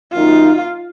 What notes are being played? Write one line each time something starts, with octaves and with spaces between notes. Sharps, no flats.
F#2 D#3 A#3 D#4 F4